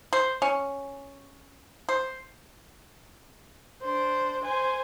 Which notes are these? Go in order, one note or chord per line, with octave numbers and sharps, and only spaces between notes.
C5
C#4
C5
D4 C5
C5 G#5